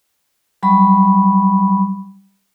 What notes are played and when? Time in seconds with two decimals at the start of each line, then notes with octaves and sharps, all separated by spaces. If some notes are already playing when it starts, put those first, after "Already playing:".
0.63 F#3 G3 B5 C#6